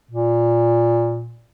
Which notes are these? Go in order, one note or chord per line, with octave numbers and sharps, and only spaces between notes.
A#2